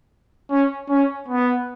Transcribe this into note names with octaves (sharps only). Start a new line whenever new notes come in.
C#4
C#4
B3